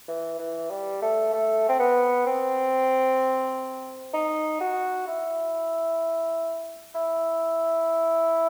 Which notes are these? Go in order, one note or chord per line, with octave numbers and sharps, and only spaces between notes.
E3
E3
G3
A3
A3
C4
B3
C4
D#4
F#4
E4
E4